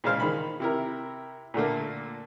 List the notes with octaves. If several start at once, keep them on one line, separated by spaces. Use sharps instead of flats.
A#2 C#3 G#3 C5 F5 F6
D#3 B5
C3 E4 A#4
A#2 D3 A3 A#3